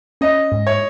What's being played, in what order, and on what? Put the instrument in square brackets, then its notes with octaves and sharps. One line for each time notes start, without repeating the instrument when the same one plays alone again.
[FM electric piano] C#4 [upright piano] D#5
[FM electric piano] G#2
[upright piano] C#5